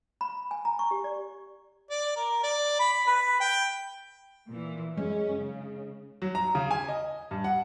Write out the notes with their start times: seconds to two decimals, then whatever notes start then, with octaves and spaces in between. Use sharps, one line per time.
0.21 B5
0.51 G#5
0.65 A#5
0.79 C#6
0.91 G4
1.04 D5
1.90 D5
2.16 A#4
2.43 D5
2.80 B5
3.07 B4
3.40 G5
4.49 A#2 E3
4.98 F#2 G#3 C#4
5.33 C#3
6.22 F#3
6.35 A#5
6.55 C#3
6.71 G#5
6.88 D#5
7.31 G2
7.44 F#5